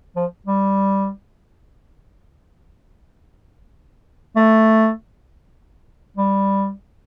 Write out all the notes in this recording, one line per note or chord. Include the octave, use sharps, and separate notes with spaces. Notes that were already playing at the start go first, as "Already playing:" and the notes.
F3
G3
A3
G3